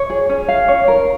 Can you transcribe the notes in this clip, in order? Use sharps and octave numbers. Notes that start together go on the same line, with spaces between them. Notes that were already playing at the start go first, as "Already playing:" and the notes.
Already playing: C#5
G#4
C#4
F5
C#5
A#4